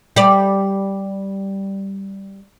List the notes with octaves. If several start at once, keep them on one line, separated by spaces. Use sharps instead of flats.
G3 D5